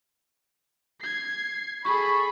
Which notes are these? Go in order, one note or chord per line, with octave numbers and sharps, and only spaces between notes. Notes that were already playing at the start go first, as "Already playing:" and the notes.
G#6 C7
G#4 A4 B5 C#6